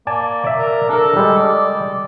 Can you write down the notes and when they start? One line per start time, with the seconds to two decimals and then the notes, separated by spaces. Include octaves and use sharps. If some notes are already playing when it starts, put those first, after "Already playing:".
0.07 A#3 D5 G#5 A5
0.44 D5 E5
0.57 A#4
0.89 D4 A4 A#4
1.16 G3 G#3
1.37 D5